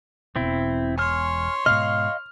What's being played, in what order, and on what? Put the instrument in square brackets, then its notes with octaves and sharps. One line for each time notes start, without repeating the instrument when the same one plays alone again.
[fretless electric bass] E1 B2 [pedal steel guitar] C4 E4
[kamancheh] C#5 C6 [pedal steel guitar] G#5 F6
[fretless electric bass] G#2 B2 [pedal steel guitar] D#5 F5 [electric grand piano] F6